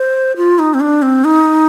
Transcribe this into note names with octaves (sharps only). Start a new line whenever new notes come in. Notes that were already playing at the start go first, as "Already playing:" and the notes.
Already playing: C5
F4
D#4
C4
D4
C4
D#4